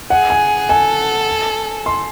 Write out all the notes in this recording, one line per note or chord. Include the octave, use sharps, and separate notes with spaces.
G#4 F#5
G#5
A4 G#5
C6